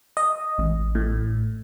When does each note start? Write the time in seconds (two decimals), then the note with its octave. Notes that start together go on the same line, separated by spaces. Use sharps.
0.17 D#5
0.58 A1
0.95 A2